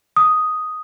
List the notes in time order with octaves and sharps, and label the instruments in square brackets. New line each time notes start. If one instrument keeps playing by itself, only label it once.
[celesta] D#6